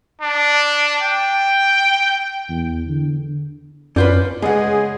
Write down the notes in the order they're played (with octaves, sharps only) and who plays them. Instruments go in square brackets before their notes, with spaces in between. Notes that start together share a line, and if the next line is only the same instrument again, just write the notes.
[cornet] D4
G5
[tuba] E2
D3
[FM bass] F#2 [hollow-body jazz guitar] C#4 F4 B4 [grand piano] D5 G6
[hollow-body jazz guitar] C#2 F#5 [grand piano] G#3 [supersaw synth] G#4